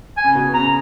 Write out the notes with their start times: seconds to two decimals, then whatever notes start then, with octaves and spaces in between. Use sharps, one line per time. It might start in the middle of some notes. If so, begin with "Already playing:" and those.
0.17 G#5
0.24 C#3
0.35 B2
0.54 C#3 A#5